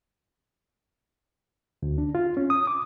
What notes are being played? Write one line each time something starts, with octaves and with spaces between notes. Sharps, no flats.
D2
D4
F4
C#4
D#6
D6